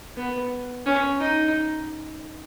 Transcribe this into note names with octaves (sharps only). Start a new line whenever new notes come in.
B3
C#4
D#4